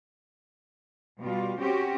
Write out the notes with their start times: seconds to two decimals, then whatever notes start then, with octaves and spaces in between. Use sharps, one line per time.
1.20 B2 G3 F4
1.59 C4 C#4 F#4 G4